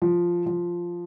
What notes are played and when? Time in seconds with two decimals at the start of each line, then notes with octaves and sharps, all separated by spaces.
0.02 F3
0.46 F3